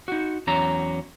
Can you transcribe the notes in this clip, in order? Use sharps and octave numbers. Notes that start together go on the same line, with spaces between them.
D#4 F#4
E2 F#3 C#4 A#5